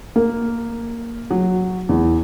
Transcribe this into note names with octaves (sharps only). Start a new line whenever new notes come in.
A#3
F#3
E2